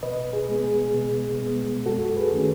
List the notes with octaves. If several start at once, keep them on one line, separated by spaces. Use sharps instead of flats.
B2 B4 D#5
G#4
G#3 B3
G#4
B2
G#3 B3
F#2 F#4 A4
G#4 B4
D#3 A3 C#4